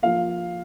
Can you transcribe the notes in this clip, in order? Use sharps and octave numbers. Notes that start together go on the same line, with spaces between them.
F3 A#3 F4 F5